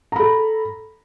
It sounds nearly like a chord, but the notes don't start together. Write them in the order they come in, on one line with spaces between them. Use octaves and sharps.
A#5 B5 A4